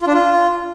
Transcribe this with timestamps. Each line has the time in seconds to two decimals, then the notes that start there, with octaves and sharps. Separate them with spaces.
0.01 F4
0.07 D4
0.13 F4